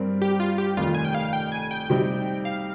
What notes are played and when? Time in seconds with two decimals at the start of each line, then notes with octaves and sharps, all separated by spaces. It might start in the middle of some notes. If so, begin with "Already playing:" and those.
Already playing: G2 G3 C4 A#4
0.22 G4
0.40 F4
0.58 G4
0.77 F1 F2 D#3 F4
0.95 G#5
1.05 G5
1.15 F5
1.33 G5
1.52 G#5
1.71 G5
1.90 C3 G3 C4 D#4
2.45 F5